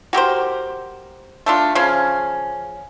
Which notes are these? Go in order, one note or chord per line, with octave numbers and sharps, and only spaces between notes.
F#4 G4 A#4 C5
A3 D4 F4
C#3 F3 C#4